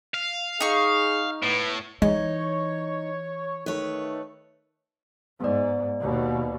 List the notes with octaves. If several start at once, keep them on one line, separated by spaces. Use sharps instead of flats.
F5
D#4 G#4 C#6
A2 B3
E3 G#3 D#4 C#5
D#3 A3 B4 C#5
G#2 B3 D5
D#2 B2